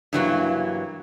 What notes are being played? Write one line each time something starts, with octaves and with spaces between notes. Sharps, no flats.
G2 E3 F#3 A#3